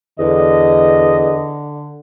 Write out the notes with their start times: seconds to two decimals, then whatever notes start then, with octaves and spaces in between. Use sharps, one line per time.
0.19 E2 D3 D#5